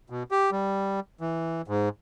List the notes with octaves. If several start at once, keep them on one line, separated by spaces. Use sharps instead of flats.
B2
G4
G3
E3
G#2